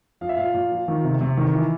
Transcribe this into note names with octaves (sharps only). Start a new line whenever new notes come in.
F3 F5
E5
A#2 F5
A#2
F3
D#3
C3
C3
D#3
E3